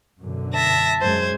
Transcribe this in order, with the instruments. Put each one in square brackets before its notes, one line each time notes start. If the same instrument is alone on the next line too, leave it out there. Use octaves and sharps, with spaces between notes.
[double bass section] F#2 B2 D3
[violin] E5 A#6 [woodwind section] A5
[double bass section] F#2 G#3 [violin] C5 G#6